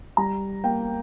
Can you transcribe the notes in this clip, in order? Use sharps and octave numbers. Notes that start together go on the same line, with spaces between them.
G3 A#5
A#3 G5